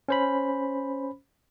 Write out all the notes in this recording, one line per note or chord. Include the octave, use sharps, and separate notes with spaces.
C#4 C5 B5